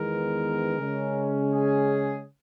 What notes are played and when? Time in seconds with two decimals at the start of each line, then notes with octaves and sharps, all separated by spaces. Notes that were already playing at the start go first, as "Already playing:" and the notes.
Already playing: E2 D#3 G#3 B3 A#4
0.78 C#3 G#3 C#4
1.52 G#4